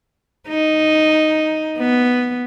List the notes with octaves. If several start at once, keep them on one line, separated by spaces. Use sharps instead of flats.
D#4
B3